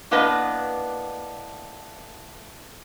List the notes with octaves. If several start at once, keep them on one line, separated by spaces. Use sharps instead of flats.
A2 A#3 B3 D4 B4 D#5